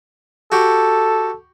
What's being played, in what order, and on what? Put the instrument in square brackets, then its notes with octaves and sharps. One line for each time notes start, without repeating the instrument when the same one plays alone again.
[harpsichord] F#4 G4 [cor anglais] A4